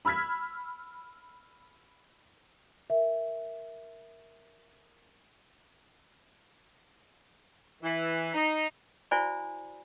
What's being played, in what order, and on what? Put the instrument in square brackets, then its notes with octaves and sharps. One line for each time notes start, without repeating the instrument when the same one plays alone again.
[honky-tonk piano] B5 E6 F6 G#6 B6
[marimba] A#4 E5
[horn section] E3
D#4
[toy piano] E4 F#4 C5 D5 G#5 B5